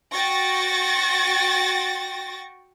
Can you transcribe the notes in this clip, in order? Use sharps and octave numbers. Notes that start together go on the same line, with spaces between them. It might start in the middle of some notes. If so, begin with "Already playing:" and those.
F#4 G5 C#6 A6 A#6